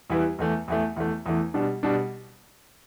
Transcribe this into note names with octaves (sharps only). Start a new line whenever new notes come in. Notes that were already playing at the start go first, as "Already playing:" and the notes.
E2 E3 G3 E4 B4
E2 E3 A3
E2 E3 A3
E2 E3 A3
E2 E3 A3
B2 G3 D4
B2 G3 D4